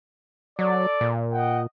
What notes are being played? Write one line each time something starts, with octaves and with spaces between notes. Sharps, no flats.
F#3 A4 D5
A#2
D#5 F#5 G5